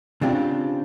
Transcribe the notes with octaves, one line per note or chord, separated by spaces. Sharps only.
C#3 C4 D4 F4 G4